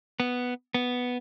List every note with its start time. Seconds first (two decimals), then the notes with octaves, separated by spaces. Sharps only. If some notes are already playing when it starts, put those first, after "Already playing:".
0.20 B3
0.74 B3